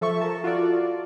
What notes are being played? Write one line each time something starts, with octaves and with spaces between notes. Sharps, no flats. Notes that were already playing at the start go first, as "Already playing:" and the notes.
F3 A4 E5 C#6
A4 A#4 A5
F4 F#4 A4 D5